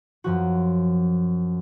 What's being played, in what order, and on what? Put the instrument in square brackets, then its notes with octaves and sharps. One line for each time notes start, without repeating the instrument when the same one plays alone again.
[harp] F#2 F3 F#4